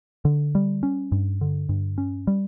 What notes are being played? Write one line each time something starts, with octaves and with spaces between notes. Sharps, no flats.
D3
G3
C#4
G2
D3
G2
C#4
G3